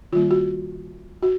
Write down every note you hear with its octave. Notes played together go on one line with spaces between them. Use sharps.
D#3 G3 A#3 F4
F#4
F#4